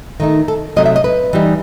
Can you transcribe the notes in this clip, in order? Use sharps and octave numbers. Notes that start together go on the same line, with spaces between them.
D#3 A3 D#4
A4
C3 F#3 A3 D#5
E5
D#5
B4
E3 G3 D#4